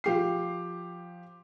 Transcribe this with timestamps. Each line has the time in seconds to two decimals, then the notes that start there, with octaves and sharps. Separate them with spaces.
0.04 F3 G4 C7